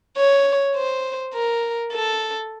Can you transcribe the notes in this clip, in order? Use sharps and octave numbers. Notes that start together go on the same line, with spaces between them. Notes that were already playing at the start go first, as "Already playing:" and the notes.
C#5
C5
A#4
A4